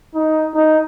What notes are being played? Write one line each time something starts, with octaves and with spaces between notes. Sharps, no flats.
D#4
D#4